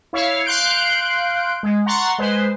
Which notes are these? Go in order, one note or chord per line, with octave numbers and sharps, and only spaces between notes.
E4 C#5 F5
F5 C6 F#6 G6 D7
G#3
F#5 A#5 C6 C#6 A6
G#3 B4 C5